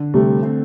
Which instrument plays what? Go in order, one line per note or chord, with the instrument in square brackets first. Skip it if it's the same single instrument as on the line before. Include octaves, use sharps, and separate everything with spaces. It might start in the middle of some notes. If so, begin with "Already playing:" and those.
Already playing: [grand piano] D3
[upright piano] C3 G3 [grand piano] A3
[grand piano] C4